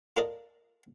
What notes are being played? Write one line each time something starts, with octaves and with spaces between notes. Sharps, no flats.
F4 A4 A#4 D5 D#5